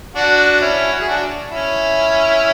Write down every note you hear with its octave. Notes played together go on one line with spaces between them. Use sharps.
D4 F#4
C#4 E4
F#4
G#4
D4 F#4
C#4 E4